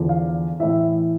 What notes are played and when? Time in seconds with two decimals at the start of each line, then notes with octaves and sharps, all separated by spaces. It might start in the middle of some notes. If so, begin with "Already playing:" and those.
Already playing: E2 D3 F3
0.09 F5
0.60 A2 E3 E5